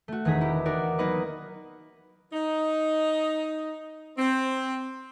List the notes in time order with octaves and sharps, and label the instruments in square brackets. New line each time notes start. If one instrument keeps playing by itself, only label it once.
[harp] A3 F#4
E1 D#3 G#4 A#5 B6
E4 G4 B6
D#4 F#4 A#4 D5
F#3 A#3 B3 D#4 B4 D#5
[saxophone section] D#4
C4